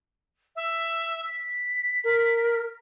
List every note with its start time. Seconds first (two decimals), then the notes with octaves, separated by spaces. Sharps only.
0.56 E5
1.26 B6
2.04 A#4